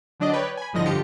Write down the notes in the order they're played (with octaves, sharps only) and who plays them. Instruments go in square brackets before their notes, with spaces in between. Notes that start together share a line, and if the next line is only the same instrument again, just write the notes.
[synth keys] D3 F#3 D4 D5 D#5 D6
B4 C#5 D5 G5
G#5 B5
G1 A2 D3 F3 D#5 A#6
G2 D3 F4 G4 C#7